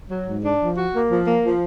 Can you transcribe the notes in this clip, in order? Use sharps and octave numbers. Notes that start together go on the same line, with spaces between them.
F#3
G#2
D4
F3
F#4
A#3
F3
A#3
F3